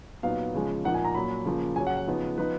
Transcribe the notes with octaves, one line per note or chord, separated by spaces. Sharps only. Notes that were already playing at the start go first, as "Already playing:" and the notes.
A#2 F#3 B3 D#4 F5
C#3 F3 G#3
A#2 F3 A#3 D#4 F#5
G#5
A#5
A#2 F#3 C#4 B5
C#3 F3 A#3
C#3 F#3 C#4 G#5
F#5
F#5
C#3 F3 B3 D#4
F3 B3 D#4 B4